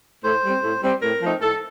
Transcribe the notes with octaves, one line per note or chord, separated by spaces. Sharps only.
A2 C5
G3 C4
A2
G3 C4
A2 A#4
F3 A3 C4 D#4
A2 A4